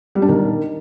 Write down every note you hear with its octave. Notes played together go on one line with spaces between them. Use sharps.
G3
D4
D#3